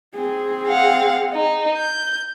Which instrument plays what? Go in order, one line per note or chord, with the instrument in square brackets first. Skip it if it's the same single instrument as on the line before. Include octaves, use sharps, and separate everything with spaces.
[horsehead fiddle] C4 G#4
[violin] F5 F#5
D#4
G6